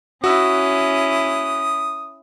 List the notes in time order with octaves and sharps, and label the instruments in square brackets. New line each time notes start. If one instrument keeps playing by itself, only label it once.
[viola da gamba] C#4 E4 [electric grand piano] F#4 E6 [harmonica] D#6